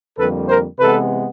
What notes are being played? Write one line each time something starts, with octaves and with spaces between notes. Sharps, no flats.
F2 D3 G3 A#3 A4 B4
A#4 C5
C3 E3 G#3 B3 A4 B4